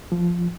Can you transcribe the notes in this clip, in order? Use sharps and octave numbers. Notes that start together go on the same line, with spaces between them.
F3